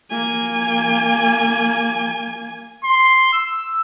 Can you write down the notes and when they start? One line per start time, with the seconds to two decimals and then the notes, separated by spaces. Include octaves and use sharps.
0.10 A#3 G#5
2.84 C6
3.33 E6